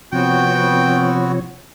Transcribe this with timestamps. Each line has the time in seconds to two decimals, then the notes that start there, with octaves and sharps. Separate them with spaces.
0.13 C3 F3 B3 C4 F#4 C#5 G5